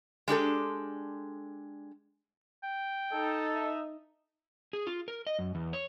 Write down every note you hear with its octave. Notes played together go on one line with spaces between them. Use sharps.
G#3 D4 G4 A4
G5
D#4 A4
E5
G#4
F4
A#4
D#5
F#2
E2
C#5